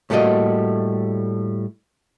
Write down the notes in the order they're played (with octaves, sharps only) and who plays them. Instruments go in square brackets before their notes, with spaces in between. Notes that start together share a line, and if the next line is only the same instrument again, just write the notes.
[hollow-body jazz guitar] A2 G3 A3 A#3 F#4 D#5